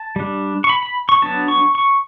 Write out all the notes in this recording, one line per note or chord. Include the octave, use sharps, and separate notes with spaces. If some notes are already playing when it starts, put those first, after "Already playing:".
Already playing: A5
G3 D4
C#6
B5
B5
C#6
F#3 B3 D4 A5
C#6
C#6